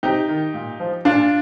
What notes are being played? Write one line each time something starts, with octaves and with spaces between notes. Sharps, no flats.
C3 D#4 G4
D#3
A#2
F3
A#2 D4 F4